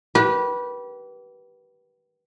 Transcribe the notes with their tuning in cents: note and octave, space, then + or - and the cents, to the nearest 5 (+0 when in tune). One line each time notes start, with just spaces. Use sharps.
G4 -30 B4 -20